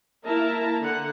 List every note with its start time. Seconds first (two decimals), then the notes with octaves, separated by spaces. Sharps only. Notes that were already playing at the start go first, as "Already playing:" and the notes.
0.25 A#3 E4 A#4 A5 A#5
0.80 D3 F#5